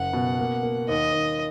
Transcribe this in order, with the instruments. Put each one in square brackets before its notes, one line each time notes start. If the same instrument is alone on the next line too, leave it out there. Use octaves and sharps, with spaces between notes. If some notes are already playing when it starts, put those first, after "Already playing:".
Already playing: [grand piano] F#1 [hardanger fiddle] F#5
[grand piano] B2
A#3
A#3
[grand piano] D#2 [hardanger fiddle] D#5
[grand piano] D#2